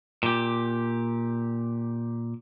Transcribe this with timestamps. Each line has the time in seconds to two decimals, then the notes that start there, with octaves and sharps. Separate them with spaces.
0.23 A#2 G4